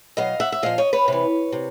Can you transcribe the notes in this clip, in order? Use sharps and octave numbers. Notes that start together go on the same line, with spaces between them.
B2 F#3 D#5 F5
E5 F#5
E5
A#2 F3 D#5 F5
C#5 D#5
B4 C#5
C3 E3
C3